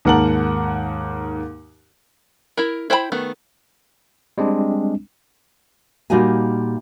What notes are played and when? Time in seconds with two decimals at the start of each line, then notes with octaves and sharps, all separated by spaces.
0.05 D#2 G#2 A#4 F#5 A5 F#7
2.57 E4 A#4
2.90 E4 C5 G5 G#5 B5
3.12 D#3 A3 B3
4.38 G3 G#3 C4 D4
6.10 A#2 G3 D#4 F4 F#4 G#5